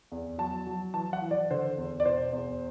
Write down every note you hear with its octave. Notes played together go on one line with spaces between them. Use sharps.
E2
F#3 A5
F#3
E3 A5
F#5
E3
D5
D3 C5
E2
D5
B2 C5
E2